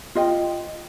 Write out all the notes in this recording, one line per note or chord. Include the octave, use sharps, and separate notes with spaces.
F4 D#5 G5